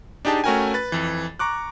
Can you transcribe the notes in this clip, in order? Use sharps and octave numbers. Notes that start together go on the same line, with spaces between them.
D4 D#4 G4 G#4 A5
A3 C#4 F#4 A#4 G5 G#5
B4 A6
F2 E3
A#5 C#6 D6 F#6